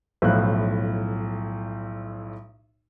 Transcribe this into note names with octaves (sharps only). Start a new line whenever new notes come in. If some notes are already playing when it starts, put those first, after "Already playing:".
B1 A2 F3 E4 F5 F#6